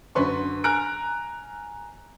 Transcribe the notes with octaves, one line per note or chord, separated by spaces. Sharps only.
F#2 D3 B4 C6 C#6
G#5 A#5 F6 F#6 D7